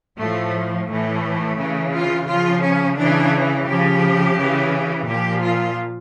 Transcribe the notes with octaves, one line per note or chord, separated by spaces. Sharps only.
A2 F3 A3
A2 E3 A3
C#3 E3
F4
C#3 F3 F4
C#4
C#3 E3 D4
C#3 F3 G4
C#3 E3
A#2 F3 G4
F4